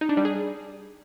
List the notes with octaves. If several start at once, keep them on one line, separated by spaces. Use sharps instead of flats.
D#4
D4
G3
G#4